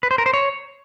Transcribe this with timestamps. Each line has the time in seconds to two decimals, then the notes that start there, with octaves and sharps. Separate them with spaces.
0.03 B4
0.11 C5
0.18 A#4
0.26 C5
0.33 C#5